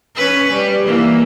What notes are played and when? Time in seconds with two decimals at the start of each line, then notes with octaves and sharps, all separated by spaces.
0.16 C#4 B4
0.52 G3
0.87 E3 A#3